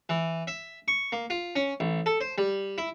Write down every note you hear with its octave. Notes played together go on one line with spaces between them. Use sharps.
E3
E5
C#6
A#3
F4
C#4
A1
A4
C5
G3
E4